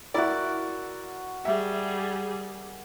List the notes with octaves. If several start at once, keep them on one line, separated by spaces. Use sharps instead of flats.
E4 F#4 A#4 D5
G3 G#4 E5